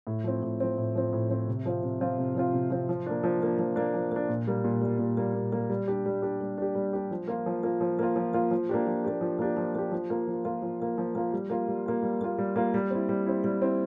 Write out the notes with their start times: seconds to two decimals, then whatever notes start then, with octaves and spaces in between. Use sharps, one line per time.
0.07 A2
0.24 F3 C4
0.43 A2
0.60 F3 C4
0.78 A2
0.95 F3 C4
1.13 A2
1.30 F3 C4
1.48 C3
1.66 F3 C4 F4
1.83 C3
2.01 F3 C4 F4
2.18 C3
2.35 F3 C4 F4
2.53 C3
2.70 F3 C4 F4
2.89 F3
3.06 A#3 D4
3.24 F3
3.41 A#3 D4
3.59 F3
3.76 A#3 D4
3.94 F3
4.12 A#3 D4
4.29 A#2
4.47 G3 A#3
4.64 A#2
4.81 G3 A#3
4.99 A#2
5.17 G3 A#3
5.34 A#2
5.52 G3 A#3
5.70 G3
5.88 D4 G4
6.06 G3
6.22 D4 G4
6.41 G3
6.58 D4 G4
6.75 G3
6.93 D4 G4
7.11 F3
7.28 A#3 F4
7.46 F3
7.63 A#3 F4
7.81 F3
7.99 A#3 F4
8.16 F3
8.34 A#3 F4
8.51 F3
8.69 A#3 D4 G4
8.87 F3
9.04 A#3 D4 G4
9.21 F3
9.39 A#3 D4 G4
9.57 F3
9.75 A#3 D4 G4
9.91 F3
10.10 A#3 F4
10.28 F3
10.45 A#3 F4
10.62 F3
10.80 A#3 F4
10.98 F3
11.15 A#3 F4
11.33 G3
11.50 A#3 F4
11.68 G3
11.86 A#3 F4
12.03 G3
12.21 A#3 F4
12.38 G3
12.56 A#3 F4
12.74 G3
12.91 C4 E4
13.09 G3
13.26 C4 E4
13.44 G3
13.62 C4 E4